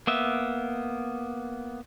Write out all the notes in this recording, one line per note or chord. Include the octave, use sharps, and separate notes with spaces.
A#3 B3 E5